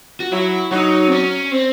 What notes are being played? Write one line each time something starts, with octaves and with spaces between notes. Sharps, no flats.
F#4
F#3 E4
F#3 D#4
C4
C#4
C4